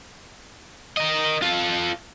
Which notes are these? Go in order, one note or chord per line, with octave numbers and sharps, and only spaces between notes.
A#4 D#5
F4 A4